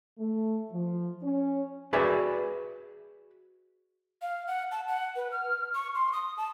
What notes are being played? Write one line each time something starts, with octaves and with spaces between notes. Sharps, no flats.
A3
F3
C#4
F#4 G#4 B4 D5 E5 G#5
F5
F#5
A5
F#5
B4
F6
C#6
C6
D#6
A5